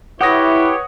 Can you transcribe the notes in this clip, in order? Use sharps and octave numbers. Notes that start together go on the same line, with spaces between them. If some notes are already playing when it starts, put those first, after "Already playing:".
E4 G4 B4 C#5 F#5 D#6 A#6